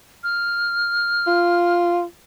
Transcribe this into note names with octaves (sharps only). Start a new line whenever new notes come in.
F6
F4